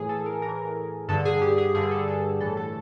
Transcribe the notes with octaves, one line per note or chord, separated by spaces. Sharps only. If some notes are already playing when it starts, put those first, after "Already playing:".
Already playing: A2 E3 G#4
A4
A#4
A2 E3 A#4
G2 D3 A4
G#4
G4
G#4
G2 D3 G#4
A4
A4
A2 E3 A4
A4